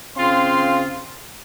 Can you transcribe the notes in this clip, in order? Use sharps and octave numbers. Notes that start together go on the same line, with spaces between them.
C#3 C4 F4 F5 C6